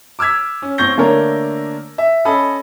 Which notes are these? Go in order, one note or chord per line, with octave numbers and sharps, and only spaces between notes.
D6 E6 F6 G#6 B6
C#4
A1 C4 C#6 G6 A#6 G7
D3 A3 A#3 D4 A#4 C#5
E5
C#4 A4 D#5 B5